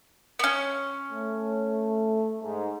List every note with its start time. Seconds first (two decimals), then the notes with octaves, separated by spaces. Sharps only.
0.39 B3 C#4
1.11 A3
2.42 G#2